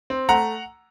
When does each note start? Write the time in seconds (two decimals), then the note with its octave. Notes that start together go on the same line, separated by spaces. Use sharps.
0.10 C4
0.29 A3 F#5 A#5